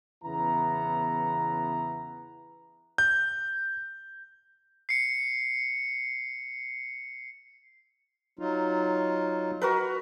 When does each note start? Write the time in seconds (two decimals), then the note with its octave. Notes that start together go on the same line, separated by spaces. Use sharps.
0.24 E2 C#3 B3 E4 A#5
2.98 G6
4.89 C7 C#7
8.39 F#3 D#4 F4
9.61 F#4 A#4 B4